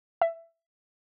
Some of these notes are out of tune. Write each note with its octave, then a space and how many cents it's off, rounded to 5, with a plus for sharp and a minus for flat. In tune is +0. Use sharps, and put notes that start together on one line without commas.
E5 +10